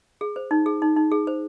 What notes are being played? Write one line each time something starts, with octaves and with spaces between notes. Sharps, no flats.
G#4
C5
D#4
G#4
D#4
D#4
G#4
C5